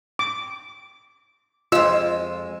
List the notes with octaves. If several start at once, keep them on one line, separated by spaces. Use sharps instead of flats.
D6
F2 G#3 F4 E6